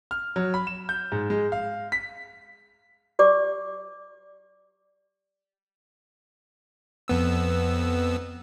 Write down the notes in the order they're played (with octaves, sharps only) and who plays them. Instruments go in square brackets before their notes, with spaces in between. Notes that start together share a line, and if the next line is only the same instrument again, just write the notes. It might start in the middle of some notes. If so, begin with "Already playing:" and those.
[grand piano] F6
F#3
B5
E7
G6
G#2
G#3
F5
B6
[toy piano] G4 D5 D6
[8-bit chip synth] F2 B3 E6